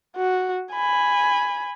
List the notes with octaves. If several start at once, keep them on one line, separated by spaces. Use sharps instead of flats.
F#4
G#5 B5